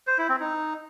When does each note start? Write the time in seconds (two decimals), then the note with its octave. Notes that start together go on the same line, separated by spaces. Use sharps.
0.07 C5
0.18 E4
0.29 C4
0.40 D#4